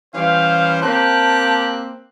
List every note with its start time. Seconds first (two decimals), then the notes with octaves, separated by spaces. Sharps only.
0.14 E3 G3 C#4 C5 F5
0.82 A#3 C4 G4 A5 F#6